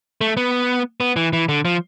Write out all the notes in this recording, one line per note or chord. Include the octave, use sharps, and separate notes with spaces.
A3
B3
B3
E3
E3
D3
F3